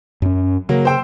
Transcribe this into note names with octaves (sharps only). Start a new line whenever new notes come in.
F#2 C#4
C#3 F#3 A#3
C5 G5 E6